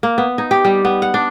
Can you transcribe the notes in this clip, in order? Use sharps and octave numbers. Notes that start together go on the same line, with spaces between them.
A#3
B3
D#4
G4
G3
B3
F#5
D4